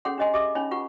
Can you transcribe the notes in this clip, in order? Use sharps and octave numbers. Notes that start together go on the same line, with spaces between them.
C#4 G#4 A4 C#5 F#5 C6
D4 G4 C#5 D#5 G#5 C6
G4 G#4 D#5 E5 D6 D#6
C#4 D#4 C#5 G#5 B5
F4 G4 B4 F#5 C#6